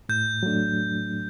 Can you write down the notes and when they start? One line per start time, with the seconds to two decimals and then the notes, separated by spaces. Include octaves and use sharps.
0.09 A2 G6
0.43 F#3 A3 D4